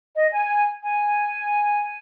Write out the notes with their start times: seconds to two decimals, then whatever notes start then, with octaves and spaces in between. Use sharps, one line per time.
0.15 D#5
0.32 G#5
0.82 G#5